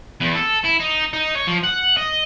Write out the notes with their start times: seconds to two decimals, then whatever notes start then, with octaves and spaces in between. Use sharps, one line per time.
0.21 E2
0.36 A4
0.65 E4
0.80 D#4
1.13 D#4
1.35 C#5
1.47 F3
1.63 F#5
1.97 D#5